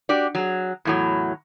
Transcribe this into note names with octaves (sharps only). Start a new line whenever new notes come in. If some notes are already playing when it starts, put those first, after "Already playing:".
D4 F#4 G4 D5
F#3 G#4
E2 A2 F#3